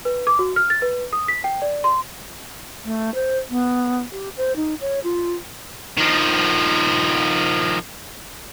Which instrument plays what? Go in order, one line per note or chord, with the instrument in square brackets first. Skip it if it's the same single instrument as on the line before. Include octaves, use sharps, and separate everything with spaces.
[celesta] B4
D6
F#4
F6
A6
B4
D#6
B6
G5
D5
C6
[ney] A3
C5
B3
G4
C5
D#4
C#5
F4
[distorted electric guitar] D#3 F3